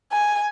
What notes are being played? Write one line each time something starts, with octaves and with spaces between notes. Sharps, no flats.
G#5